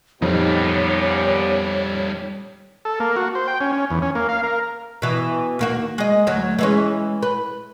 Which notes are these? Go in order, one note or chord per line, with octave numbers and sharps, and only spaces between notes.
F2 A#2 D#3 G3 B3 D#4 G4 C#5
A4
A#3
F#4
C5
G5
C#4
C#4
E2
C#4
A#3
F5
A#4
B2 E3
D#2 A#3 F#4
G#3 D#5
D2 F#3
E3 G#3 C#4
B4